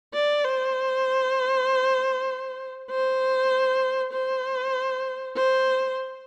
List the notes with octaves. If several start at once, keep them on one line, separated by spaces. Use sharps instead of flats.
D5
C5
C5
C5
C5